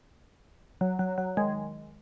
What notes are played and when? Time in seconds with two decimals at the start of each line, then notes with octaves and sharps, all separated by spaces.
0.81 F#3
0.99 F#3
1.18 F#3
1.37 D#3 G#3